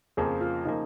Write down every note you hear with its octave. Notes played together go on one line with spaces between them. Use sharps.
F2 C#3 F3 A#3 G#4
F4
C#3 F3 A#3 D#4